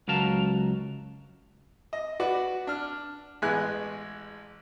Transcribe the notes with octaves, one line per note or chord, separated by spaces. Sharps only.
C#2 F#3 A#4 F5 A5
D#5
F#4 B4 D5
D4 F6
A1 G#3 B3 G#5 F#6